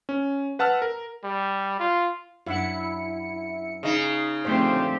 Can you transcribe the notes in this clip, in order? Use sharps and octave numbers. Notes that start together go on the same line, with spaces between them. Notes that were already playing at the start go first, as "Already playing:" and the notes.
C#4
B4 F#5 A5 E6 F6
A#4
G3
F4
F#2 D4 E4 F#5 C#7
C#3 D#4
A#2 D3 F3 A3 C4 G4 C5